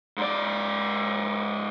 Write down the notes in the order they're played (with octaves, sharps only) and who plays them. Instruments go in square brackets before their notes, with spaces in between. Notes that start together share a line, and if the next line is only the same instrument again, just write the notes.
[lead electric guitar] G#2 D5